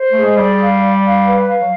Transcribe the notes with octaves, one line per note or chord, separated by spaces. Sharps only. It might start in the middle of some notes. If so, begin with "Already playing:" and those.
Already playing: C5
A3 G#4
G#3
G3 D5
F5
D5
F5
B4
F5
F#3